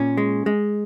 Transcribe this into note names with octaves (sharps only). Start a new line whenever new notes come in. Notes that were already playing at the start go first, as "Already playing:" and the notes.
Already playing: A#2 C#4
G#3
G#3